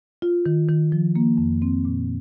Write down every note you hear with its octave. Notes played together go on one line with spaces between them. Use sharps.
F4
D#3
D#3
F3
A#3
F2
C4
A#2